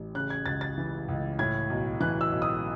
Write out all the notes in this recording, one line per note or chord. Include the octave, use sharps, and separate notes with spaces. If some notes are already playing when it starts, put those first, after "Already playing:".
Already playing: A1
C#3 F#6
G#6
C#2 A6
A6
E3
C#2
A2 G#6
B1
E3 F#6
E6
B1
D#6